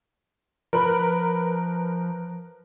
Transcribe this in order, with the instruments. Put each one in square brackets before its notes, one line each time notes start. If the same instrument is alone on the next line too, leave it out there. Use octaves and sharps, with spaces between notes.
[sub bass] F3 [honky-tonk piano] A#4 B4 B5